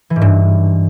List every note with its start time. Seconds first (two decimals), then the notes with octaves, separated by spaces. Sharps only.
0.10 E3
0.16 G#2
0.21 G2